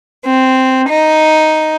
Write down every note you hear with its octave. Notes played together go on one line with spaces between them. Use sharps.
C4
D#4